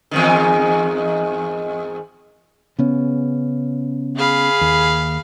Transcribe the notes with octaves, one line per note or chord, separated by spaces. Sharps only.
E2 G#2 D#3
C#3 B3 C#4
G#4 F5 B5
D#2